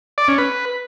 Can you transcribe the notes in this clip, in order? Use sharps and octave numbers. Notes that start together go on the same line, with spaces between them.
D5
C#4
B4